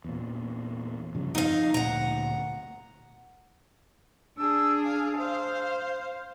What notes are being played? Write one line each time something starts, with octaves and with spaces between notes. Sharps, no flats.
E2 A#2
G2 C#3 F3
F2 D#4 F5
D2 A#2 F#5 A#5
D4 G#4 E6
F5
C5 F5